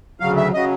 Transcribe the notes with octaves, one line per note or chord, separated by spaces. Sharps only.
D2 C#3 F#3 F5
E5
C#3 F#3 D#5